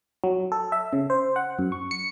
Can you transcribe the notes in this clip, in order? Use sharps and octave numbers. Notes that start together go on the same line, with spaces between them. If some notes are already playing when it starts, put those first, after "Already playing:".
F#3
A4
E5
C#3
C5
F#5
F#2
C#6
C#7